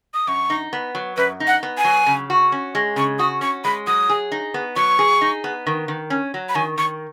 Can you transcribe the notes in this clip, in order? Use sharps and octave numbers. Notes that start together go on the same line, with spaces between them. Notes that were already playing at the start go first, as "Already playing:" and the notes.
D#6
F#2 C#6
D#4
B3
F#3
F#2 B4
D#4
F#5
B3
G#5
F#3
C#3
F#4
C#4
G#3
C#3 C#6
F#4 D#6
C#4 C#6
G#3 B5
F#3 D#6
G#4
D#4
B3
F#3 C#6
G#4
D#4
B3
D#3
D#3
C#4
F#3
B5
D#3 G#5
D#3 C#6